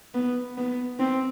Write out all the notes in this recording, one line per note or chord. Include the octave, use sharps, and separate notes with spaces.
B3
B3
C4